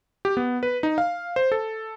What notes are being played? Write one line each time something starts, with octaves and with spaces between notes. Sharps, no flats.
G4
B3
B4
D#4
F5
C5
A4